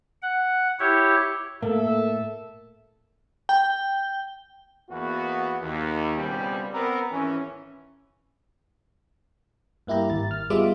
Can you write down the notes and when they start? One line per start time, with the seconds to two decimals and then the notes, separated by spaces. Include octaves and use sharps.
0.22 F#5
0.80 E4 G4 C#5
1.62 A2 A#3 A4 E5
3.49 G5
4.90 E2 A#3 B3 F#4
5.62 D#2
6.17 C#2 B2 G3 C4 G4
6.72 B3 C4 A#4
7.11 G#1 E3 C#4
9.87 G2 A#3 E4 G4 A#5
10.10 G#1 A6
10.31 F6
10.50 G3 G#3 B3 F4 E5 D6